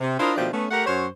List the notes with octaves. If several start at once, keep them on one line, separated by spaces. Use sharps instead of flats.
C3
D4 E4 F4 A#4 C5 D#5
B2 D#3 F3 A3 D4 G4
A3 B3 C#4
A3 G4 A#4 F#5
F#2 C5 C#5